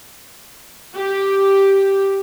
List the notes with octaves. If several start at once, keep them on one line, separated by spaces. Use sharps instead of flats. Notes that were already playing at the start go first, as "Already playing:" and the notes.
G4